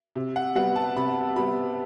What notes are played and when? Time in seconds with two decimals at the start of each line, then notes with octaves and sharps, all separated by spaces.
0.16 C3
0.36 F#5
0.55 G3 B3 F#5
0.76 A5
0.96 C3 B5
1.36 G3 B3 B5